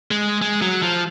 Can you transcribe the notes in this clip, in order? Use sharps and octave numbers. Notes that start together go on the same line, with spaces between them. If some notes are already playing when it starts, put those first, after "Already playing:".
G#3
G#3
F#3
F3